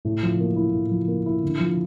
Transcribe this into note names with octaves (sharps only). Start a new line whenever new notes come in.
A2
F3
A#3
E4
A2
F3
A#3
E4
D3
F3